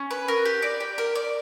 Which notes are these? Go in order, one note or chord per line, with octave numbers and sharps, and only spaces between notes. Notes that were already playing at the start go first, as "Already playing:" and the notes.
Already playing: C#4
B4
A#4
G4
D5
G4
A#4
D5